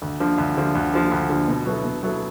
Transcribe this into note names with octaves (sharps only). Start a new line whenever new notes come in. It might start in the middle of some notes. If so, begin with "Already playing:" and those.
D2
D3 F3
D2
D3 F3
D2
D3 F3
D2
D3 F3
B2
F#3 B3 E4 A4
B2
F#3 B3 E4 A4